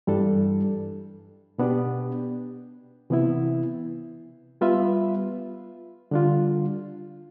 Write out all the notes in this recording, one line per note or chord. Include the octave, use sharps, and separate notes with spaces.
G2 E3 G3 D4 A4
B2 B3 D4 G4
C3 E3 B3 E4
G3 B3 F4 B4 E5
D3 G3 D4 F4